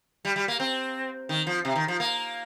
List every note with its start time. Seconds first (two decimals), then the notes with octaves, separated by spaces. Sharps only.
0.25 G3
0.36 G3
0.48 A#3
0.60 C4
1.29 D#3
1.47 F3
1.65 C3
1.75 D#3
1.88 F3
2.00 A#3